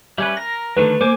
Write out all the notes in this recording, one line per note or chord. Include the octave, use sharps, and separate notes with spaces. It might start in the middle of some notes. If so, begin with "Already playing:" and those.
G3 C#4 B4 E5
A#4 A#6
D3 D#3 F3 A3 B4
A#3 C5 G#5 D6